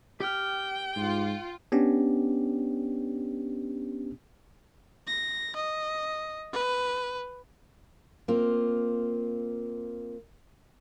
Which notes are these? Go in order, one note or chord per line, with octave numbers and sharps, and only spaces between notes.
G4 G5 F6
G#2 F4
B3 C#4 D4 G4
A#6
D#5
B4
A#3 C4 F4